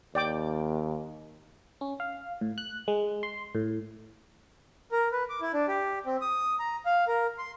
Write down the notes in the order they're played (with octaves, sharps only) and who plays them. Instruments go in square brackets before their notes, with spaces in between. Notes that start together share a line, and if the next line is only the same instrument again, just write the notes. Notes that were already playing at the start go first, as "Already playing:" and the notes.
[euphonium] D#2 [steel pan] D5 G5 D6
[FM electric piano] C#4
F5
A2
F#6
G#3
C6
A2
[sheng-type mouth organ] A#4
B4
D6
E4
D4
G4
C4
D#6
A#5
F5
A#4
C6